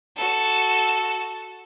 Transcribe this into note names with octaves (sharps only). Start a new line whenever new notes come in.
F#4 A4